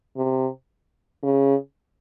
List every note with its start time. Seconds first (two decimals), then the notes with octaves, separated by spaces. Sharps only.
0.16 C3
1.23 C#3